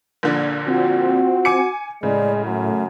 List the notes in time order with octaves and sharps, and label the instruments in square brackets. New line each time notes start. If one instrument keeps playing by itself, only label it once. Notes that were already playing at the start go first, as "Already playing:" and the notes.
[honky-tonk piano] A#1 A#2 D3
[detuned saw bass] C4 [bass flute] F4 [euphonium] F#4
[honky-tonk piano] G#5 D6 C#7
[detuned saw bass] A2 [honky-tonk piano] C#3 [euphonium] G#3 [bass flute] D5
[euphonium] F#2 [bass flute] A3